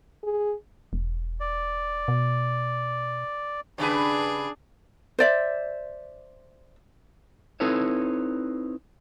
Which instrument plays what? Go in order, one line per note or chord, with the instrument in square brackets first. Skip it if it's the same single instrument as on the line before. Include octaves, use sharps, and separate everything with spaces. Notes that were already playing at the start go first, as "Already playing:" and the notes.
[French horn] G#4
[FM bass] E1
[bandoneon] D5
[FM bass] B2
[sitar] G2 C#3 B4 [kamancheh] D4 G#4
[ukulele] C5 D5 E5
[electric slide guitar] C4 D#4 E4 A4 B4 C#5